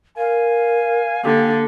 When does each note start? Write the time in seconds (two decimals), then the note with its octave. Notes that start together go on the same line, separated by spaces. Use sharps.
0.17 A#4 F5 G#5
1.24 D3 A#3 G4